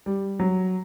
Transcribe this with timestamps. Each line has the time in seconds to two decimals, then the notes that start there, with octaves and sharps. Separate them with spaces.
0.06 G3
0.40 F#3